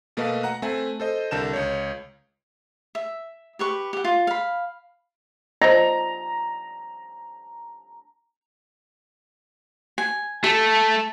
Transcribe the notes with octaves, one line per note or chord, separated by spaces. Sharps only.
B2 A3 A#3 B4 D#5 F5
F#5 A#5 F#6
A3 C4 E5 G#5
A4 C5 D#5
C2 D3 A#4 A5 G6 E7
C#2 C#5
E5
G4 B4 C#6
G4 F#5
F4
F5 B5
C5 D#5 A#5
G#5
A3 A4